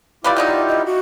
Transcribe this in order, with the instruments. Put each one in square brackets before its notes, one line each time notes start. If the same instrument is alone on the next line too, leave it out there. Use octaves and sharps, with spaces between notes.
[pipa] G3 B4 D5 [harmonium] E4 F4 G4 [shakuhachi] F5
[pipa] D#3 F#3 D#4 [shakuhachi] D5
[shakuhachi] D#5
F#4